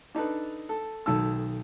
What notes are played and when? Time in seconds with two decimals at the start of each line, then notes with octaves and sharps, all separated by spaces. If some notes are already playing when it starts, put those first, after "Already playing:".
0.15 D4 D#4 A4 B4
0.69 A4
1.06 B1 D#3 A4 A5 E6